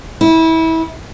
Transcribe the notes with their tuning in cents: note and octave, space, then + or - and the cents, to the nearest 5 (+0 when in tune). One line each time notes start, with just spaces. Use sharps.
E4 -25